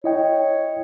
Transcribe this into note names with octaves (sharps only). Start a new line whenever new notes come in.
E4 C#5 D#5 G5